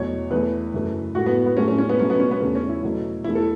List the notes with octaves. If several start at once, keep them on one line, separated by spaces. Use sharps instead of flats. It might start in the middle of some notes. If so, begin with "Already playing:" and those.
Already playing: E2 B2 F#3 A3 C#5
E2 E3 A3 B4
F#2 C#3 E3 A3
A2 A3 F#4
B3
B3
A2 F#3 A3 C#4
C#4
C#4
B3
B2 F#3 A3 C#4
B3
C#4
B3
E2 C#3 A3 C#4
C#4
E4
E2 B2 F#3 A3
E2 E3 A3 E4
A4